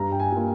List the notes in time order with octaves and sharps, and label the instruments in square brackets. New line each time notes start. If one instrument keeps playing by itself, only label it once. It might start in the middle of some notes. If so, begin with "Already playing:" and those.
Already playing: [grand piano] G2 A#5
G5
G#5
G3 A#3 F4